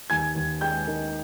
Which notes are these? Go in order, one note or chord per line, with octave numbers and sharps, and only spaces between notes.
D#2 G#5 G#6
D#2
G#3 G5 G6
D#3